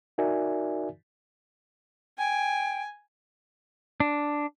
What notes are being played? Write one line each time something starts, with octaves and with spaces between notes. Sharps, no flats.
D#4 F#4 A#4 D5 E5 G#5
G5 G#5
D4